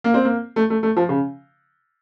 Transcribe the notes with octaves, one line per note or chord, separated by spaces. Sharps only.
A#3
C4
A#3
A3
A3
A3
F3
C#3